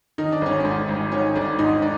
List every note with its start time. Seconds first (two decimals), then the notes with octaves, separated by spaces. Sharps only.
0.18 D#3 D#4
0.32 D4
0.42 G#1 C#4
0.60 G#2 D4
0.89 G#1
1.12 D#3 C#4
1.36 G#1 D4
1.59 G#2 D#4
1.82 D4